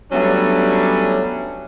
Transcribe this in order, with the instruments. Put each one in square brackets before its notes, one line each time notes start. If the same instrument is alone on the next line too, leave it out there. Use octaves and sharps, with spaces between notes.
[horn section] F#3 G3 A3 B3 C#4 D4